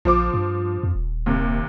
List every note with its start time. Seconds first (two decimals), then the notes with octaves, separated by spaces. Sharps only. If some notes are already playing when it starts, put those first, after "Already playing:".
0.05 A#1 F3 C5 D6
0.34 G2
0.83 F2
0.95 D#1
1.26 D#2 C3